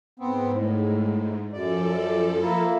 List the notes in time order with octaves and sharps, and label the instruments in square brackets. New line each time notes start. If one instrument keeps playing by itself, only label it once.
[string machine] G#2 [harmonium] B3 C4
[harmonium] A2
[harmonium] F#2 D5 [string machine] F3 A4
[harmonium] A#3 E4